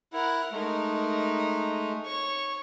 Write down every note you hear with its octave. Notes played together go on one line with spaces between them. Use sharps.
E4 A#4 F#5
G#3 A3 D#4 A#4
C#5 C#6